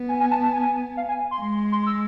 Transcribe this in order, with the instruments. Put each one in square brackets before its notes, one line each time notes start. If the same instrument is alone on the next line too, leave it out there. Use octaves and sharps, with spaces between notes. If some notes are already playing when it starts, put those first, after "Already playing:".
Already playing: [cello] B3
[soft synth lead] G#5
G#5
A5
A5
G#5
F5
G#5
C6
[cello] G#3 [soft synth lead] C6
[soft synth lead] C6
E6